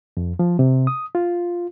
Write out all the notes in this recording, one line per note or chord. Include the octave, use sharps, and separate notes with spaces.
F2
F3
C3
D#6
F4